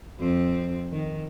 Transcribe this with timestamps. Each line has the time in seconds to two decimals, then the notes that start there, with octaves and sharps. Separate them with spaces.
0.20 F2 C4
0.92 D#3